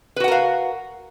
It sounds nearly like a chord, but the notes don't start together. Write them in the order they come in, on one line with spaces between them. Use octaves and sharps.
B4 F#4 F#5 A#4 F5